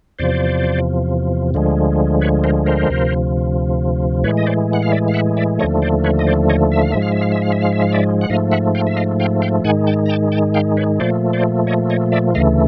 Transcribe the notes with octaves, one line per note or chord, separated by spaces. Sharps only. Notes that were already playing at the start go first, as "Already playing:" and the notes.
E2 C3 F3 C5 D5
D2 D3 F3 G#3
B4 C#5
A#4 C5
A#4 C5
D2 C3 F3
A2 E3 G#3 B4 C#5
D#5
C5 D5
F#5
F5
D5 E5
F5
E5 F#5
D5 E5
D#2 D3 F3 A3 C#5 D#5
C5 D5
B4 C#5
D#5
C5 D5
C#5 D#5
E5
F5
G#2 F3 G#3 E5
F5
E5
F5
E5
F5
E5
F5
E5
F5
D5 E5
F#5
G#2 F3 A3 D#5 F5
E5 F#5
F5 G5
E5
D#5 F5
F5 G5
F5 G5
G#2 D#3 G#3 F#5 G#5
G5 A5
A#5
G5 A5
G5 A5
F5 G5
B4 C#5
A#2 F3 A3 C5 D5
C5 D5
C#5 D#5
C#5 D#5
D5 E5
D2 C#3 E3 A3 D#5 F5